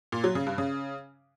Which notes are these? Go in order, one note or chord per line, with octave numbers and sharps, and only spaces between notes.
A#2
F#3
C#3
G2
C#3